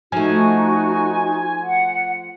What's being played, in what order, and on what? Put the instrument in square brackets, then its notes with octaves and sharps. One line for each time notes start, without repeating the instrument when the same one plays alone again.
[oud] F3 A3 [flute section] D#4 F#4 [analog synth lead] G#5
[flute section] F#5